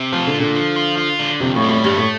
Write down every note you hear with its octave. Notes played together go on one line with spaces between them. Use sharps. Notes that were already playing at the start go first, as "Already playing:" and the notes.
Already playing: C3
F3 F4
D3
A#2
D3
F3
F4
F4
D3
F2 C3
A2
G3
A2
G2 A3
A2